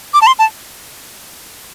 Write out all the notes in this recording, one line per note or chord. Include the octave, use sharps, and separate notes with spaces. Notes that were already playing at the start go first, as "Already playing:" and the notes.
D6
A5
C6
A5